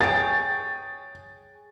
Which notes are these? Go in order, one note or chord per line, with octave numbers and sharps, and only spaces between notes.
G#4 C#5 G5 A6